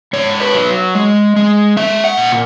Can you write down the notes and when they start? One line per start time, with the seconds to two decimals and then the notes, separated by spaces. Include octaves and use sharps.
0.13 G#2 C#5
0.40 B4
0.54 F#3
0.95 G#3
1.36 G#3
1.77 G#3 E5
2.04 F#5
2.17 A#2